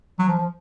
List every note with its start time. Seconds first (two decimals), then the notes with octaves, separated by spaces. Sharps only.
0.19 F#3
0.28 F3
0.38 F3